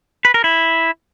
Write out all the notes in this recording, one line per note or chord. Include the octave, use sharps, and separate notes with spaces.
B4
A#4
E4